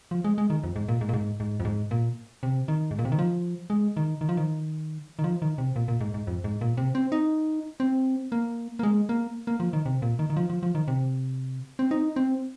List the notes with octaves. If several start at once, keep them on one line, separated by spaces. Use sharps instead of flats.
F3
G#3
G#3
D#3
F2
G#2
A#2
G#2
A#2
G#2
G#2
F2
G#2
A#2
C3
D#3
G#2
A#2
C3
D#3
F3
G#3
D#3
D#3
F3
D#3
D#3
F3
D#3
C3
A#2
A#2
G#2
G#2
F2
G#2
A#2
C3
C4
D#4
C4
A#3
A#3
G#3
A#3
A#3
F3
D#3
C3
A#2
D#3
D#3
F3
F3
F3
D#3
C3
C4
D#4
C4